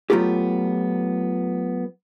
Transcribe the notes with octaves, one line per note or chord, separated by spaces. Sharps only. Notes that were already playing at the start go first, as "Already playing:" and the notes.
F#3 G#3 A3 B3 F4 G4